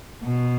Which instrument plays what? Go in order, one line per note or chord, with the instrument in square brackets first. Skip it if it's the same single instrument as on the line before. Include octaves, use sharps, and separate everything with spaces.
[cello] B2